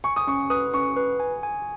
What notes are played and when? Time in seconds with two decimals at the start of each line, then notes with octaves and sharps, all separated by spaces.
0.04 G#5 C#6
0.16 D#6
0.27 C#4 C#6
0.50 B4 D#6
0.74 C#4 C#6
0.97 B4
1.20 G#5
1.43 G#5